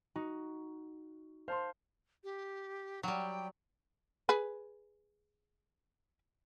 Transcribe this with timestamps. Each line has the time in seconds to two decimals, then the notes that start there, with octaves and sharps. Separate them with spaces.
0.15 D#4 F#4
1.48 C5 F5 A5 C6
2.24 G4
3.03 F#3 G3 G5
4.29 G#4 B4